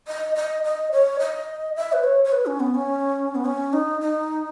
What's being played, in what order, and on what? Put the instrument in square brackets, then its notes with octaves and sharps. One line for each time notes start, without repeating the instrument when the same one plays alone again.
[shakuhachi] D#5
D#5
D#5
C#5
D#5
E5
B4
C#5
C#5
B4
C#4
B3
C#4
B3
C#4
D#4
D#4